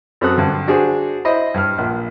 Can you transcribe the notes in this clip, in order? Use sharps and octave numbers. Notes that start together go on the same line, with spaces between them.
F#2 C4 F#4 A4 D#6 F#6
G2 D3
D4 F#4 G#4 C5
E4 C5 D#5 B5
G2 F6
A#1